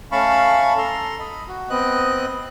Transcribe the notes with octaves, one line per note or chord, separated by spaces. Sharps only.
A3 C#4 F5 A5 B5 C#6
A4 A#5 C6
D#5 B5
F#4
B3 C4 D#5 F#6